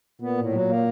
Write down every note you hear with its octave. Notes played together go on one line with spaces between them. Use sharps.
A#2 B3
A2
F#3
A#3